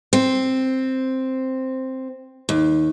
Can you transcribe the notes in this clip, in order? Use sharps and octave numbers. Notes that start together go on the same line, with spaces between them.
C4
D#2